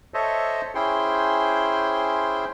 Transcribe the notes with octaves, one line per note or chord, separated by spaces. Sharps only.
A4 C5 C#5 D#5 E5
C#4 E4 G#4 C5 G5 C6